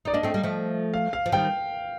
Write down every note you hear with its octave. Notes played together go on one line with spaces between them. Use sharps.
D#4 D5
A#3 D4 D#5
A3 C4
G3 A#3
F3 A3
F5
F5
F3
D#3 G3 G5